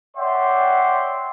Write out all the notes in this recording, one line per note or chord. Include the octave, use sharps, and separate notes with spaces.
C#5 D5 E5 F#5 G5 C6